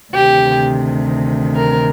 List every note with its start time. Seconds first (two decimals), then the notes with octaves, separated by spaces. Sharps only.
0.13 D2 C3 D#3 G4
1.56 A#4